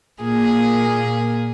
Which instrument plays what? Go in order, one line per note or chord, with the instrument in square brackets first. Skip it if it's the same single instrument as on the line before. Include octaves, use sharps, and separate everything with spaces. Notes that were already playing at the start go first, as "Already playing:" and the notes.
[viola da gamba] A#2 A#3 G#4